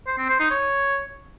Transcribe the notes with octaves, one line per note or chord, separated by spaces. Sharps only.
C5
C4
C5
D#4
C#5